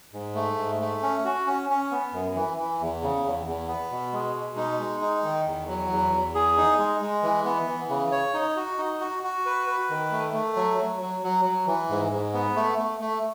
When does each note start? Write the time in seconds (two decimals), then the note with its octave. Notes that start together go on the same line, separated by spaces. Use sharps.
0.13 G#2
0.35 A3
0.58 G#2
0.81 A3
1.03 C#4
1.25 F#4
1.47 C#4
1.69 C#4
1.91 B3
2.13 F#2
2.35 E3
2.57 E3
2.80 E2
3.02 C#3
3.25 E2
3.46 E2
3.68 B3
3.91 B2
4.12 G#3
4.35 B2
4.57 D#4
4.79 G#3
5.01 D#4
5.24 D#3
5.46 E2
5.68 F#3
5.91 E2
6.12 E2
6.35 G#4
6.57 D#4
6.79 G#3
7.01 G#3
7.23 E3
7.45 B3
7.68 E3
7.89 C#3
8.12 C#5
8.34 D#4
8.56 F#4
8.78 D#4
9.00 F#4
9.23 F#4
9.46 B4
9.67 B4
9.90 D#3
10.12 A3
10.34 A3
10.56 F#3
10.78 F#3
11.01 F#3
11.23 F#3
11.45 F#3
11.66 E3
11.90 G#2
12.12 G#2
12.34 B3
12.56 A3
12.78 A3
13.00 A3